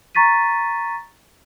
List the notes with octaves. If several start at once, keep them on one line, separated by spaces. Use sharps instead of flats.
A#5 C#6 A6 B6 D#7